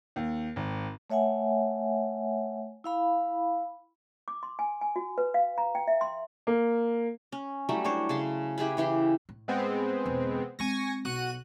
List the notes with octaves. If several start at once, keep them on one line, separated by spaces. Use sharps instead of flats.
D#2
G#1
A3 C#5 E5 F#5 G#5
E4 F5 B5
D6
C6
G#5
G#5
F#4
B4
F5
A#5
G5
E5
C6
A#3
C#4
F#3 G3 A3 E4
D4 C5 C#5
C#3 A5 C6
E4 G4 G#4 B4
C#3 E3 G4 C6
A2
G#3 B3 C4
E1 D3
G#3 C4 G#5 C#6 A#6
B1 F#4 F#6 D#7